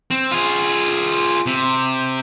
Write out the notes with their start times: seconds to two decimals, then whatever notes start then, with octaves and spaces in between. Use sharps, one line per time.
0.11 C4
0.31 F4 G#4
1.46 C3